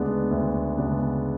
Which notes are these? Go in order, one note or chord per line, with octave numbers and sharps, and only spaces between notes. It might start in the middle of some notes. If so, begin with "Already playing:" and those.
Already playing: D2 C#3 G#3 B3 D4
D2
C#3 G#3 B3 D4